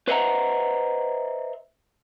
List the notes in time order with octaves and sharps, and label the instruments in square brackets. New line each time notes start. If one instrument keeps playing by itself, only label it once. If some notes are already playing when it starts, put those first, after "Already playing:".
[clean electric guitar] B4 C5 D#5 E5 F#5 A#5